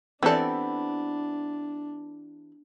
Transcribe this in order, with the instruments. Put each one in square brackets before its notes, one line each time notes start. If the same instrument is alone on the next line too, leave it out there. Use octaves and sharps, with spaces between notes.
[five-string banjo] E3 G4 D5 [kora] B3 E4 [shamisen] C4 A4 [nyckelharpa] D4